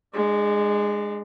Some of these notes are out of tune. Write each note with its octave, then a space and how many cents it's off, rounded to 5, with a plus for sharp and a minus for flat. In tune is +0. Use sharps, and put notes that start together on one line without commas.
G#3 -5 D4 +35